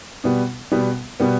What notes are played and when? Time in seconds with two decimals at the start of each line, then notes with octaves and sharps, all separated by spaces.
0.24 B2 G3 B3
0.72 B2 G3 B3
1.20 B2 G3 B3